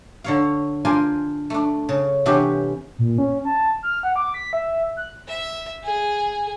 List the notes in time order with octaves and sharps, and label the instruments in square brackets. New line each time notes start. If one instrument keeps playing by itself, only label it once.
[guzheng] D3 C#5 F5
D4 F4 A#4 C5 G#5
A3 D4
C#3
C3 E3 B3 C#4 D4 G4
[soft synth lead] A#2
C#4
A5
F6
F#5
D6
B6
E5
F#6
[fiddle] E5
G#4